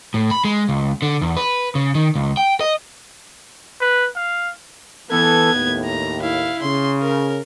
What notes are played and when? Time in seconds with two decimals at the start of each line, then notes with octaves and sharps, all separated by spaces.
0.14 A2
0.31 B5
0.45 G#3
0.69 C#2
1.02 D3
1.21 E2
1.37 B4
1.75 C#3
1.95 D#3
2.15 C#2
2.37 G5
2.61 D#5
3.80 B4
4.16 F5
5.10 E3 B3 A4 G#6
5.53 D#2 A2
5.85 A#5
6.20 E4 F5
6.62 C#3 C6
7.02 A#4